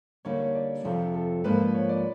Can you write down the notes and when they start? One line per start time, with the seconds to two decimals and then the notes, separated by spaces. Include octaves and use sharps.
0.25 D3 G3 A#3 D#4 C#5
0.40 C#5
0.55 D5
0.85 F2 C3 F3 A4
1.14 A4
1.44 G#2 F3 A#3 D4 B4
1.74 C#5
1.89 D5